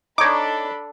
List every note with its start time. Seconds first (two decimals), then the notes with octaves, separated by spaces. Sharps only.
0.18 D4 D#4 A4 C#5 B5 D6